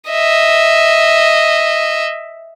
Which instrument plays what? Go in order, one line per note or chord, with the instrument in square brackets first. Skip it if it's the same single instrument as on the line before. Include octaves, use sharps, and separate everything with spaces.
[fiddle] D#5 E5